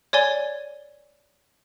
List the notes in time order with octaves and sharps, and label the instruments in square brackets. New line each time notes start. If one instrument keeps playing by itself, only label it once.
[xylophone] C#5 D5 G#5 G7